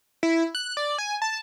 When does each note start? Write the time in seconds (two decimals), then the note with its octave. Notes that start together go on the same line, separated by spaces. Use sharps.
0.23 E4
0.55 F#6
0.77 D5
0.98 G#5
1.22 A5